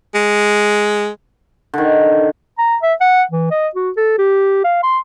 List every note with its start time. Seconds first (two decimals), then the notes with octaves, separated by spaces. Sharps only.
0.14 G#3
1.74 D3 D#3
2.58 A#5
2.83 E5
3.01 F#5
3.32 E3
3.51 D#5
3.75 F#4
3.97 A4
4.19 G4
4.64 F5
4.83 C6